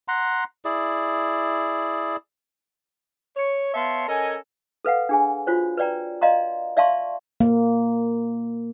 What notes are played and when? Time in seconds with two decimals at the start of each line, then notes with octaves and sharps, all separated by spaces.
0.08 F#5 A#5 C6
0.65 E4 G#4 D5
3.36 C#5
3.74 B3 C#5 E5 F5 A5 C6
4.08 C#4 A4 A#4 D#5 G#5
4.85 A4 B4 F5 F#5
5.09 D4 G#4 G#5
5.47 F4 F#4 C5 C#5
5.77 B4 C#5 D5 G5 A#5
6.21 D5 D#5 F5 A#5 C6
6.77 D5 E5 F5 A5 C6 C#6
7.41 A#3